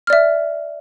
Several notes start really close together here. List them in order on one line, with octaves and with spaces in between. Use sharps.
F6 D5 E5